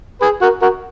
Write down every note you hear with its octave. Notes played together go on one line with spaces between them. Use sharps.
G#4 B4
F#4 A#4
F#4 A#4